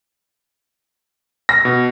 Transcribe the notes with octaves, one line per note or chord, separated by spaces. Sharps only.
A#6
B2